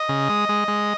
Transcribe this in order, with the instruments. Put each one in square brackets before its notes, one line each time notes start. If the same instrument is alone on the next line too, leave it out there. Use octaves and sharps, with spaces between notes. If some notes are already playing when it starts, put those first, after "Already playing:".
Already playing: [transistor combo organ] D#5
C#3
G#3
G#3
G#3